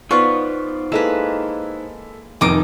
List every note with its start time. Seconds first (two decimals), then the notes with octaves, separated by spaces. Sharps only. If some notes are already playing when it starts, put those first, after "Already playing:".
0.11 B3 D#4 F4 B4 C5 D5 C#6
0.92 G#3 A#3 E4 A4 B4 E7
2.41 F1 F2 D#3 D#4 D6